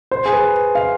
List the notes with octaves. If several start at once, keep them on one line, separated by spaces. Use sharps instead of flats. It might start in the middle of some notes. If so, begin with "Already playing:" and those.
C5
G#4
B4
F5